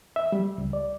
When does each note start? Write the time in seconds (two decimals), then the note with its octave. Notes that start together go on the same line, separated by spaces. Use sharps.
0.16 E5
0.32 G3
0.58 C#2
0.73 D5